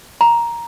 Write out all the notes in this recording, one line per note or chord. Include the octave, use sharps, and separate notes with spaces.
A#5